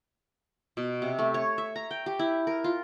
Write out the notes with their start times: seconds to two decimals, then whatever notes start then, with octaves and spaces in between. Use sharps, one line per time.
0.77 B2
1.02 C3
1.19 A3
1.34 C#5
1.58 E5
1.76 A#5
1.91 G5
2.06 G4
2.19 E4
2.47 A#4
2.64 F4